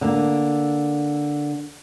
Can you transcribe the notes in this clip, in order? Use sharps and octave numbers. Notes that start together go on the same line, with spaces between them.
D3 A#3